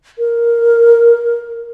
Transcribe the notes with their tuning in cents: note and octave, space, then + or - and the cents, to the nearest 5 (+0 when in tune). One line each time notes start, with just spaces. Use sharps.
A#4 +5